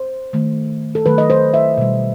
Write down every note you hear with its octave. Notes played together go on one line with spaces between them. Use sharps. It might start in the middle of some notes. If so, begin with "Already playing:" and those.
Already playing: C5
D#3 A3
A4
D#3 F#3 A3 B4
D#5
C5
E5
B2 G3